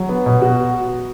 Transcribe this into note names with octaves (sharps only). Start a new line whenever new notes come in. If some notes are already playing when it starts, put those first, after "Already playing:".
Already playing: F#3
B3
B2
F#4